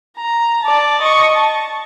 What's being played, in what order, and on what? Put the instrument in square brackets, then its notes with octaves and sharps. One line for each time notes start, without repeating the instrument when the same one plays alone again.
[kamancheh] A#5
D5 A5
D#5 C#6
A5